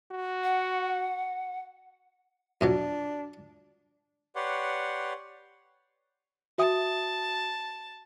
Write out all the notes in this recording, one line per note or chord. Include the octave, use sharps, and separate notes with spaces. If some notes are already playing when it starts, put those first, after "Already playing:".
F#4
F#5
F2 B2 F#3 D4
G4 B4 C#5 D5 F#5 C6
F#4 E5 A5 D#6